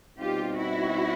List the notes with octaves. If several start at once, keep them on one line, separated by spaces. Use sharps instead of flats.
B2 G3 C4 D#4 F4 G4
E4 F#4